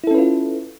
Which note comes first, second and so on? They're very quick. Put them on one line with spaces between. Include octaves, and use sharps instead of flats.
E4 A4 C#4 B4 F4